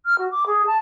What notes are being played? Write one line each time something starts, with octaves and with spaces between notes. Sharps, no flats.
F6
F#4
D6
G#4
A5